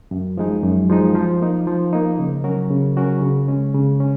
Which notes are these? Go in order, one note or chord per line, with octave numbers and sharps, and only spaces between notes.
F#2
F3 G#3 D#4
F#2
F3 G#3 D#4
F3
A#3 D#4
F3
A#3 D#4
C#3
F#3 C#4 F#4 A#4
C#3
F#3 C#4 F#4 A#4
C#3
G#3 C#4
C#3
C#4